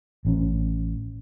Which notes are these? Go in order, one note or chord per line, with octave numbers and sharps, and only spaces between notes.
A1 C4 C#4